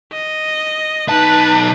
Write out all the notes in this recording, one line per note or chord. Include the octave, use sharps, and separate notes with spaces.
D#5
B1 D#4 B4 A5